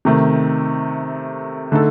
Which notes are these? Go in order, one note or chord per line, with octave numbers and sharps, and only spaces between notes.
C3 D#3 A3
D3 A3 D#4 A4